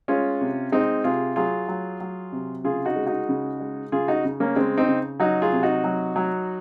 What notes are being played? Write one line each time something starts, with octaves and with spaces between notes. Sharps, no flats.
G#3 C#4 F4
C3
G#3 C4 D#4
C3 F4 G#4
F#3 F4 G#4
F#3
F#3
C3
C#3 F4 G#4
D#4 F#4
G#3
D#4 F#4
C#3
G#3
C#3 F4 G#4
D#4 F#4
C#3
A#3 C#4
C#3 G#3 C4
C4 D#4
C#3
F#3 D#4 F#4
F4 G#4
C3
D#4 F#4
F#3
F#3